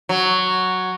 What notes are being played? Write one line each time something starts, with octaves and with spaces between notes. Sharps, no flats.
F#3